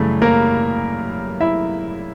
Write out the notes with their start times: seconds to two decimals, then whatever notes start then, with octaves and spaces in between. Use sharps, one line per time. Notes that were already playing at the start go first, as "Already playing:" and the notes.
Already playing: F#2 C#3 E3 G3 A3
0.22 A#3 A#4
1.40 E4 E5